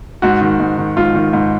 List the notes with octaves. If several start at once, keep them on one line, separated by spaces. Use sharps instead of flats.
G#2 F#4
D#3
G#2
D#3
G#2 F4
D#3
G#2